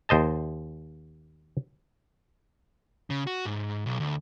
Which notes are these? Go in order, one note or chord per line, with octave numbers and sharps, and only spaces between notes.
D#2 C5 D#5 A5
C#3
F#4
G#2
B1
D2